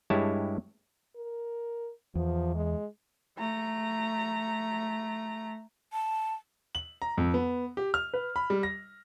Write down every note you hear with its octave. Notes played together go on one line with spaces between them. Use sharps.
G2 G#3 E4 G4 C#5 A5
A#4
E2 F3
G#3
A3 A#5
A5
F#7
A#5
F2
B3
G4
F6
B4
B5
G3
A#6